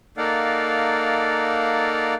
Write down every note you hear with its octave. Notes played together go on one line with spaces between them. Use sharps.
A#3 D#4 A4 D5 F5 F#5